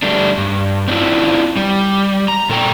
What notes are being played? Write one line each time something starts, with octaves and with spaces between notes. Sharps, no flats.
G3 A3 D4
G2
C4 D4 E4 F4
G3
A#5
A#2 A4 G5 A#5